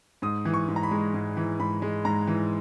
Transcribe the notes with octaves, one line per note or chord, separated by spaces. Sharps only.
G#2 D#6
E3
C#6
G#2
A#5
B5
G#3
G#2
E3
G#2 B5
G#3
G#2 A#5
E3